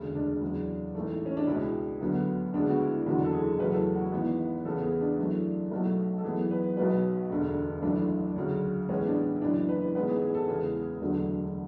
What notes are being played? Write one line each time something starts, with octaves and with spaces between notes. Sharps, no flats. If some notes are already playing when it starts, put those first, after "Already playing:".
Already playing: E1 D2 C#3 G#3
D4
E2 C#3 F#3
A1 G#2 E3 A3
C#4
D4
C#2 B2 G#3 E4
D2 D3 F#3 B3
D2 C#3 G#3 B3 D4
F#4
E4
F#1 E2 D3 F#3 F#4
A4
G#4
E2 C#3 F#3 A3 B4
A4
F#4
E4
G#1 G#2 E3 B3
E2 C#3 E3 B3 A4
G#4
D4
F#2 E3 A3
B1 B2 F#3 A3
A4
F#2 E3 B3 G#4
B4
B1 B2 F#3 B4
E1 D2 D3 A3
G#1 F#2 E3 A3 D4
D2 C#3 F#3
A1 A2 G#3 B3 C#4
D4
E4
F#1 F#2 E3 D4
B4
A1 G#2 G#3 B3 B4
G#4
G#4
A4
E2 C#3 G#3 B3 G#4
E1 D2 D3 F#3 A3